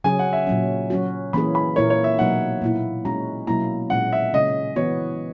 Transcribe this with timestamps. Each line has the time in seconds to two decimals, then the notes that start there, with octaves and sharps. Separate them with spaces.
0.04 C#3 F#3 C#4 G#4 G#5
0.19 F#5
0.33 E5
0.47 A#2 F#3 C#4
0.90 F#3 C#4 F#4
1.33 E3 A#3 C#4 G#4 B5
1.55 B5
1.76 A#2 A#3 E4 A#4 C#5
1.90 C#5
2.04 E5
2.18 B2 F#3 A#3 D#4 F#5
2.62 A#2 A#3 E4
3.05 G#3 C#4 F#4 A#5
3.47 B2 F#3 A#3 E4 A#5
3.90 A#2 G#3 C#4 F#5
4.13 E5
4.34 C#3 G#3 C#4 D#5
4.76 E3 B3 F#4 C#5